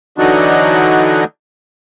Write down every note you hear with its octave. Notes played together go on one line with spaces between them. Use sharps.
D3 E3 F#3 D4 D#4 F#4